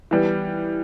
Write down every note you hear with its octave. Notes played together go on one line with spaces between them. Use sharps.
E3 G3 B3